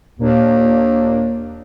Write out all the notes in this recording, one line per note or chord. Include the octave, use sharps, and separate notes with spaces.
D#2 A#2 A#3 D4